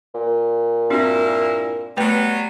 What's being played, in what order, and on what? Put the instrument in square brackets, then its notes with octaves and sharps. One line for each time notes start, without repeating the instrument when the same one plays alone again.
[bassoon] A#2
[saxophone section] G2 A#3 E4 [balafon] C4 D4 F#4
[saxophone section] F#3 G3 B3 [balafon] A3 B4 G5